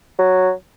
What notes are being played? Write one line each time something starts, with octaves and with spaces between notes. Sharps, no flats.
F#3